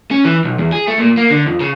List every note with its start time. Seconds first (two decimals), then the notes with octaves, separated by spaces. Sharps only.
0.11 C#4
0.25 E3
0.44 B1
0.59 E2
0.72 G#4
0.88 A3
1.00 A#2
1.17 A#3
1.30 D3
1.46 F2
1.61 C#3